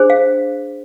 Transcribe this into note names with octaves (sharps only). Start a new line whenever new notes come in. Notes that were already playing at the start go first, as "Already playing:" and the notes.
Already playing: D4 G#4 C5
F5